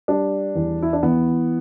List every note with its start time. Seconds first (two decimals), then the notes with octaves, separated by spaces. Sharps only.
0.08 G3 D4
0.55 E2
0.82 E4
0.93 D4
1.03 E3 B3